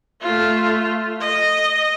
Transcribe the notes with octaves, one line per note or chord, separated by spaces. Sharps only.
A3 F4
D#5